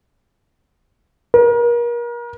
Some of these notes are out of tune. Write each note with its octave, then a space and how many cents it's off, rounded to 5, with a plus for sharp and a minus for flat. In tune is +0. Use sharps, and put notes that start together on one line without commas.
A#4 +35